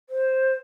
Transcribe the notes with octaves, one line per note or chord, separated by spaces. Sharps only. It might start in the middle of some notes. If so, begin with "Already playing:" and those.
C5